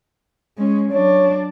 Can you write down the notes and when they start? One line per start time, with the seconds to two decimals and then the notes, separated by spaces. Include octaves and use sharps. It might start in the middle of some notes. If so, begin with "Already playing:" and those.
0.58 G#3 C#4
0.92 F#3 D4 C#5